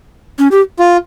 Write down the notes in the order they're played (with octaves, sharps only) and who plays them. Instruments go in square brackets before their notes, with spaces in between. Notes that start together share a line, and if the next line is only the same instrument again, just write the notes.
[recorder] C#4
G4
[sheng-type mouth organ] F4